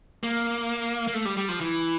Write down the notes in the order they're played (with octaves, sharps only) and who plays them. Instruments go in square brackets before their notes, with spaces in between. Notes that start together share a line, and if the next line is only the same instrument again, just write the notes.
[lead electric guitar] A#3
A#3
A3
G3
G3
F3
E3